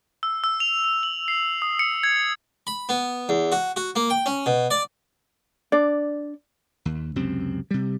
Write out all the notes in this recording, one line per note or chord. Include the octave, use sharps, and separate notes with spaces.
E6
E6
F7
F7
F#7
C7
D#6
C#7
G#6
B5
B3
E2
F#4
F#4
A#3
G5
C#4
B2
D5
D4 D5
D#2
C#2 F#2 C3 C4
C3 G3